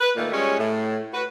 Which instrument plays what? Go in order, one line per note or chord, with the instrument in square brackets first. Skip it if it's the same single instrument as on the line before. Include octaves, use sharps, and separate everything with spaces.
[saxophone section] B4
A#2 D#3 A3 A#3
G3 G#3 C#4 F4 C#5
A2
F#4 B4